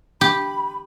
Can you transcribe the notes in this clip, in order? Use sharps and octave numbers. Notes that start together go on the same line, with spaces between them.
G4 B5